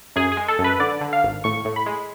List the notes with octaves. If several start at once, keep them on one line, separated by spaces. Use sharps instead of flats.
F#2 G#4
G#4
G#3
A4
F#2
B4
D3 D5
D3
F5
G#1
A2 C#6
A2
B5
G#3